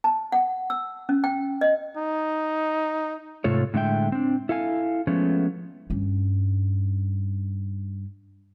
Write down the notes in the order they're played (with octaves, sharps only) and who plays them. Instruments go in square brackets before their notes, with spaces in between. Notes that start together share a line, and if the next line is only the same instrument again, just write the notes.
[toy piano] A5
F#5
E6
C#4
G5
D#5
[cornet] D#4
[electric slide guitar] G#2 C3 A3 F4 A4 C#5
A2 D3 G#3 E5 G5
C4 D4
E4 A4 F5 G#5
F3 G#3 A3 B3 C#4
[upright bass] G2 C#4